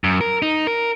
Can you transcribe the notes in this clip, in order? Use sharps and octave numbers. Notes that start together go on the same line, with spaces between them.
F#2
A#4
D#4
A#4